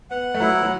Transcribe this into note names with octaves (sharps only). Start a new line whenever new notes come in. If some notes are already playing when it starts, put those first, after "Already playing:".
B3 F#5
A3
F#3 E4
F#3